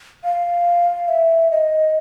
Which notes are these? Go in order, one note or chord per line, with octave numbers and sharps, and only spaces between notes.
F5
E5
D#5